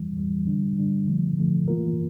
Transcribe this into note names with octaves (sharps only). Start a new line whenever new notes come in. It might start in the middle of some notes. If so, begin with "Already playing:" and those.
Already playing: E2 E3 G3
E2 E3 G3
D3 G3 D4
D3 G3 D4
D3 F3 A3
D3 F3 A3
E3 A#3 F4 A#4